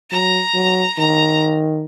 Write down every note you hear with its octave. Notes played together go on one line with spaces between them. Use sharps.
F#3 A#5
F#3
D#3 A#5